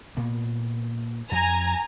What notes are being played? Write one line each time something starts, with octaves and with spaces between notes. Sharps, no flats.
A#2 A#3 B3
F2 G#5 A#5